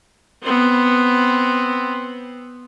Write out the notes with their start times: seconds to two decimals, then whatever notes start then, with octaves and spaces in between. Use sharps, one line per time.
0.41 B3 C4